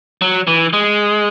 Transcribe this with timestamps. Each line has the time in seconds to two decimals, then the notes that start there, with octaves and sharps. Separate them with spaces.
0.22 F#3
0.47 E3
0.73 G#3